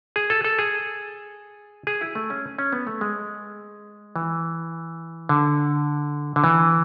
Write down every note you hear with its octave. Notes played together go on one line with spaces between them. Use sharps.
G#4
A4
A4
G#4
G#4
E4
A3
C#4
C#4
B3
A3
G#3
E3
D3
D3
E3